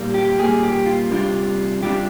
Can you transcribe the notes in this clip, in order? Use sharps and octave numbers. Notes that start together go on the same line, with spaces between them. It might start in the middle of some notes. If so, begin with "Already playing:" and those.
Already playing: A#2 G3 A#3
G4
A#2 G3 A#3 G#4
G4
F4
C3 G3 D4 F4
C3 G3 D4 F4 G4